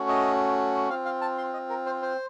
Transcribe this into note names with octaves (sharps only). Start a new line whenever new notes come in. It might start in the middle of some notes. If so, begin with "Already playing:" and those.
Already playing: A3 C#4 F#4
D#5
C4 F4 F5
F5
A5
C6
D#5
A#4
C5
C5